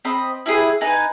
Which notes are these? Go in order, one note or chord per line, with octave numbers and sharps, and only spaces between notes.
C4 D#5 B5
E4 G4 G#4 B4
D#4 B4 G#5